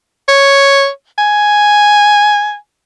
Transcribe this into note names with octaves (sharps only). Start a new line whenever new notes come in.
C#5
G#5